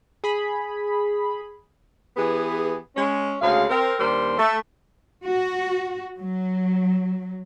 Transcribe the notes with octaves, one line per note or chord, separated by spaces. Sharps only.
G#4 B5
E3 B3 G4 G#4
G#3 C#4
D2 C#3 G#3 F5
C4 A#4
D#2 G3 D4 A#4 C5
A3
F#4
F#3